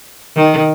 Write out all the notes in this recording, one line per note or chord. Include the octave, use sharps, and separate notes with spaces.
D#3